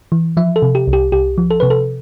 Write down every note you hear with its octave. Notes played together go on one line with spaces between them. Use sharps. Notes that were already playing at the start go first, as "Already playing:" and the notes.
E3
F3 E5
A4
C3
G4
C2
G4
C2 G4
F3
A4
C3 B4
A4